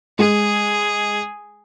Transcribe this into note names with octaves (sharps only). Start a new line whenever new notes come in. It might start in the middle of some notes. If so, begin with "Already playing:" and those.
G#3 G#4